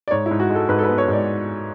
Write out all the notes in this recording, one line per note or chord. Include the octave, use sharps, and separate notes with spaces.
D5
G#2 C#5
E4
G#2
F#4
G#3
A4
G#2 B4
A4
B4
B3
C#5
G#2
D5